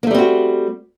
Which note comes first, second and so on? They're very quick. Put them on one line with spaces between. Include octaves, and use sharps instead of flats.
A#3 A3 G3 C4 F#4